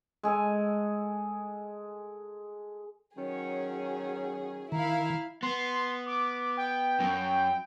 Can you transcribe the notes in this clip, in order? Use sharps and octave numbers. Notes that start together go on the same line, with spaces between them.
G#3 G#4 A4 G#5
D#3 F#3 C#4 G#4
D#3 E4 F5 A#5
B3 C6
D6
G5
F#2